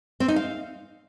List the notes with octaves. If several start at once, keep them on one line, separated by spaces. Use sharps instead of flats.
C4
D#4
F5